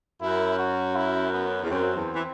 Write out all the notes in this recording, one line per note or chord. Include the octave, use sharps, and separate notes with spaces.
F#2 E4
F#4
E4
B3
E2
F#2 C4
E2
E3